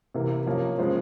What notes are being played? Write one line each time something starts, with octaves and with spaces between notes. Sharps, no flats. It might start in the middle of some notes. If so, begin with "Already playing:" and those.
C3 E3 A#3
F3 A#3 C#4
C#3 F3 G#3 C4